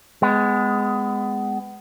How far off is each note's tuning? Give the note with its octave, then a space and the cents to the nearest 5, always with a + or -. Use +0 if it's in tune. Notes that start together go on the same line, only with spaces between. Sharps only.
G#3 +0 B3 +25